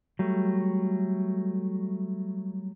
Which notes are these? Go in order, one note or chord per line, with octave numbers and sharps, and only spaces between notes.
F#3 G3 A3